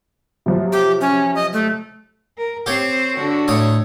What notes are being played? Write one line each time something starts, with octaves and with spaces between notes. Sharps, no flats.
C3 F3 F#3
G4
C#4
D#5
A3
A#4
C4 G4 C5 C#5
D3 F#4
A2 C#5 D#6